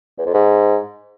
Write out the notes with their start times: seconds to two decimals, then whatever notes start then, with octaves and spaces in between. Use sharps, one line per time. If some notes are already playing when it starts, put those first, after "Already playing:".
0.18 E2
0.26 F2
0.34 G#2